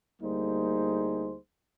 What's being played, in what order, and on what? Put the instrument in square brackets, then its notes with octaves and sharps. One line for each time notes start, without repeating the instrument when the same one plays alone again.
[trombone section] D2 G3 A#3 D#4 G#4 C5